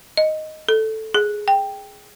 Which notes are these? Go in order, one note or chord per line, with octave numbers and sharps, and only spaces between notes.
D#5
A4
G#4
G5